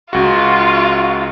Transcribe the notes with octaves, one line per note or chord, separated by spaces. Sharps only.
C#2 F4 F#4